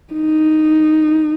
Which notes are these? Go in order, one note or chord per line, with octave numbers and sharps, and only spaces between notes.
D#4